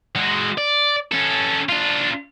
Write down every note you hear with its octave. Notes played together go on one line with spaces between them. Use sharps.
G#3 F#4
D5
C#4 A4
D4 F4